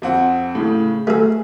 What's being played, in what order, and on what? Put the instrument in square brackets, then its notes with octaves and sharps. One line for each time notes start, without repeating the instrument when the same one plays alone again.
[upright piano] F2 C4 F#5
A2 C#3
[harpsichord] A3 A4 [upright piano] G#4